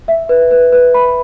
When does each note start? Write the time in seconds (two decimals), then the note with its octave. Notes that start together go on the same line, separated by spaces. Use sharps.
0.08 E5
0.29 B4
0.51 B4
0.72 B4
0.94 B5